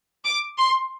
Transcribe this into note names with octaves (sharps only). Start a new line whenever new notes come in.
D6
C6